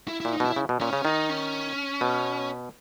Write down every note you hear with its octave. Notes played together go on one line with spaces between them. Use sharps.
E4
A#2 E4
D#4
B2 E4
C#3
B2
A#2 C#4
C#3
D#3 D#4
C#4
B2